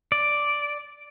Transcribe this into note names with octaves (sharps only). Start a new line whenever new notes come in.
D5